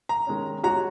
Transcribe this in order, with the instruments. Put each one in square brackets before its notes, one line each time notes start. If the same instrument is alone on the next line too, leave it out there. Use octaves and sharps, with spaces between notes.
[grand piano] A#5
[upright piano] D#3 G#3 C#4
[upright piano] G#3 F#4 C#5 [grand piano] A#5